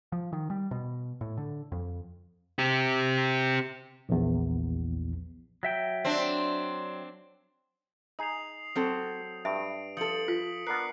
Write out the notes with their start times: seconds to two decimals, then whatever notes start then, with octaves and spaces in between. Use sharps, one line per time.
0.12 F3
0.33 D#3
0.50 G3
0.71 B2
1.21 A2
1.37 D3
1.72 F2
2.59 C4 G4
4.09 A#1 E2
5.63 F#3 E5 G5
6.05 C4 D4
8.19 D#4 G#4 D#6 C7 F7
8.75 F#3 C4 A4
9.45 G2 E5 D7
9.97 F3 A4 D#6 C#7 F#7
10.28 F4 B6
10.67 B3 D4 A#4 F#6 C7